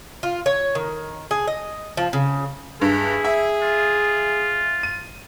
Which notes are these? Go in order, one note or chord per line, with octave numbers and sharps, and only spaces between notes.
F4
C#5
D#3
G#4
D#5
F3
C#3
G2 E4 G#4
E5
F4
D#7